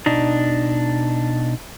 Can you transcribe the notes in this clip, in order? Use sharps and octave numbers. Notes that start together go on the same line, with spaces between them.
B2 D4 D#4